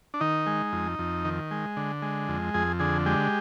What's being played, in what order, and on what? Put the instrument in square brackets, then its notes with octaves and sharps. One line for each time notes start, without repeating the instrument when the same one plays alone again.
[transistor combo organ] D4
D#3 D#4
G#3
F2
F2
D#3
G#3
D3
G#3
F2
F2 G#4
D3 G#4
G#3 G4